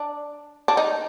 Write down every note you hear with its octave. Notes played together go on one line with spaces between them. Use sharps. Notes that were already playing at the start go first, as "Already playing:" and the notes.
Already playing: D4
D4
D#4